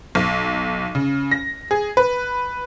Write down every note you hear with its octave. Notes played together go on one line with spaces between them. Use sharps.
B1
C#3
A#6
G#4
B4